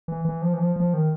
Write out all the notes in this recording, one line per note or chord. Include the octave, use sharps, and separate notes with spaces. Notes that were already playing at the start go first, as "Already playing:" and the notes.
E3
E3
F3
E3
F3
F3
D#3